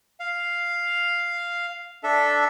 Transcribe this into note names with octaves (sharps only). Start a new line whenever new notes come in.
F5
D4 A4 E5